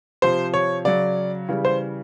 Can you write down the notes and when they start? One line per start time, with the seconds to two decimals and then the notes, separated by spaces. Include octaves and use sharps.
0.22 C3 F3 C5
0.54 C#5
0.85 C#3 F#3 D5
1.48 C#3 E3 G3
1.65 C5